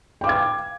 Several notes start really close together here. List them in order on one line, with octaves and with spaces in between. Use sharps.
G5 D6 F5 G#6